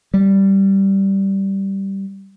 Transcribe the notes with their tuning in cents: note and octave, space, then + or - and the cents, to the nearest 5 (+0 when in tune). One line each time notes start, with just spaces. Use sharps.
G3 -10